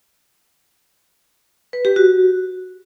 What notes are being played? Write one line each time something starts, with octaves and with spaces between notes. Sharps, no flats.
B4
G4
F#4